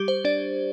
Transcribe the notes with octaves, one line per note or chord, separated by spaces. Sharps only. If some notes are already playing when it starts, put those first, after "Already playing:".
Already playing: G3 G4
C5
D4 D5